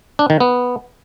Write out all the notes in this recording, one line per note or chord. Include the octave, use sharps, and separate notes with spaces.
D4
D#3
B3